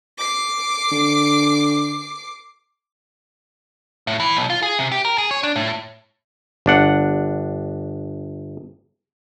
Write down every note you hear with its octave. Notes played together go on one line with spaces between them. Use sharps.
D6 C7
D3
A2
E3
B1
F4
G#4
C3
G4
A#4
G#4
C#5
D4
A2
G1 D4 F#5